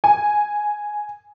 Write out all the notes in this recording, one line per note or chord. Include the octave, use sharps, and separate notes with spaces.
G#5